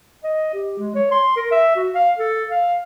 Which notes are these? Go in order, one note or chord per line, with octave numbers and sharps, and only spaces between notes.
D#5
G4
G#3
C#5
C6
A#4
E5
F#4
F5
A4
F5